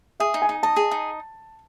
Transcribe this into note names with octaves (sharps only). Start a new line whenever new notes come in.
G#4 E5
D#4
G#5
D#4
D#5 A5
G#4
D#4